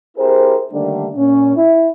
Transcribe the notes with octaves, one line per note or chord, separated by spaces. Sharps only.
C4 E4 G4 G#4 A#4 C5
D3 D#3 G3 A3 A#3 D4
A#2 C#4
E4